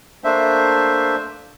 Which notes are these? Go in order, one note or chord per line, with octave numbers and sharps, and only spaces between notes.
A3 A#3 D4 C5 E5